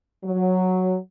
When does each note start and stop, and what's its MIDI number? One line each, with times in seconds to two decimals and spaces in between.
0.24 0.96 54